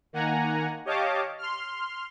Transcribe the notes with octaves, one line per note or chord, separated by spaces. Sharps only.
D#3 A#3 F#5 G#5 A#5
G4 C#5 D#5 F5 A5 D6
C6 F6